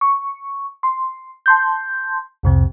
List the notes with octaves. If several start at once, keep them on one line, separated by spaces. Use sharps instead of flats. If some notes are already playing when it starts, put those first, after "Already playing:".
C#6
C6
A5 C6 G6
C2 F2 C3